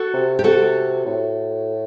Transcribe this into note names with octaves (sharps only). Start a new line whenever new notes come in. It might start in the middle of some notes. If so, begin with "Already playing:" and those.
Already playing: F#4 A4
C3
G4
C3 F#4 A4
A2